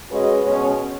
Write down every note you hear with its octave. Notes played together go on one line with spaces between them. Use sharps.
G#3 C#4 F#4 B4 D#5
B2 G#3 C#4